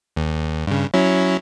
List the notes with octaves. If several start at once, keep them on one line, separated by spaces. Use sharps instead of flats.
D#2
G2 C#3
F#3 C#4 E4